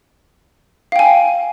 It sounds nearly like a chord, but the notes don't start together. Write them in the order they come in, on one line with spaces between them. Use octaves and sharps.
F5 G5 G#5